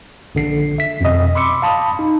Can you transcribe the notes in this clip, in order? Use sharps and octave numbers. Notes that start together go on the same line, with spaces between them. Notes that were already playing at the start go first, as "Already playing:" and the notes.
A#1 D3 C7
E5 B6
F2 B2 D#5
B5 C6 D6 E6 C#7
F5 A5 B5 D#6
D#4